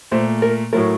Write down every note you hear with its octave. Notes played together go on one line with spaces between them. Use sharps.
A#2 A3 C5
A#4
A2 F#3 A3 A#4